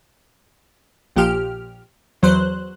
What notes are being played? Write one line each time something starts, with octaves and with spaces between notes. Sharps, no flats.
A#1 A#2 F3 G4 F6
E2 F#3 C5 F#6